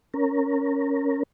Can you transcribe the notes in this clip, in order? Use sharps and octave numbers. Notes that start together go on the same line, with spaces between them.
C#4 A#4